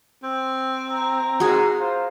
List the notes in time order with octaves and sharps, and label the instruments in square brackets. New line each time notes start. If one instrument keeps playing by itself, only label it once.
[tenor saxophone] C4
[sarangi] A#5
[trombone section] G#2 [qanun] F#4 G#4
[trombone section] F4 C5